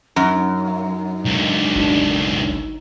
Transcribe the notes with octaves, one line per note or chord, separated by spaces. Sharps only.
F#2 D#4 A#5
C#2 D3
G#1 D4